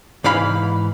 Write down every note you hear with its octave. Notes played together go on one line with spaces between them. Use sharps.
G#2 E3 F5 B5